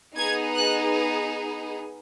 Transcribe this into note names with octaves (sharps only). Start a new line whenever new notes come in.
B3 D#4 G#4 G#6
F#6